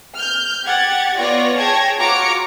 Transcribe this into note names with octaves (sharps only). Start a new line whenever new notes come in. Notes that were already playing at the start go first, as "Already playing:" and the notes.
F6 G6
G4 F#5 G#6 A6
B3 F4 C#5 D5 C#6 A#6
G#4 C#5 G5 A5 G#6 A#6
F4 F#4 C#5 A#5 D6 C#7